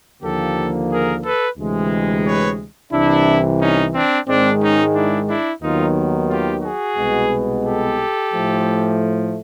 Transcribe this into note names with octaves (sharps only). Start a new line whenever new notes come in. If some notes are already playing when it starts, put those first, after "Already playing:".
D#2 D3 F3 A#3 G4 A4
G#4 A#4
A4 B4
D2 C3 E3 G#3
B4 C#5
C2 C3 E3 D4 E4
C#4 D#4
C4 D4
G#2 D#3 G#3 C4 D4
C#4 D#4
D4 E4
D4 E4
D#2 D#3 F#3 B3 D#4 F4
F4 G4
F#4 G#4
C2 B2 G#3 B3
G4 A4
A2 F3 A3